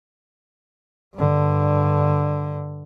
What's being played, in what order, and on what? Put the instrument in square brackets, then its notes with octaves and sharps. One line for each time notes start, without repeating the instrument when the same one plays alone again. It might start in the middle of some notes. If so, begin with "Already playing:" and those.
[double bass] G2 D3